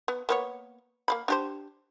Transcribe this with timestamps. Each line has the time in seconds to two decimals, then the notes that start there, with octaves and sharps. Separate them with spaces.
0.08 B3
0.29 A#3 B3 C#5
1.08 A#3 F5 B5
1.28 D4 G4 C5